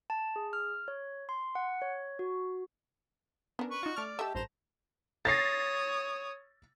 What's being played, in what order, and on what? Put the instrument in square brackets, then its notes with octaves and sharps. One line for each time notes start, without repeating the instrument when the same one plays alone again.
[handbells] A5
G#4
F6
C#5
C6
F#5
C#5
F#4
[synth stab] B3 A#4 [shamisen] C#4 D4
[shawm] B4 [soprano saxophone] C#6
[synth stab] D#4 F4 [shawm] F#4
[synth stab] A3 F6 [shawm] D5
[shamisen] A3 A4 [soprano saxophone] G4 [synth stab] D#5 E5 E6
[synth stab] A1 G2 E7 [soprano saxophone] C5 [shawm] A#5
[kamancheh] C#5 D#6 [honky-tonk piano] A6 A#6 C7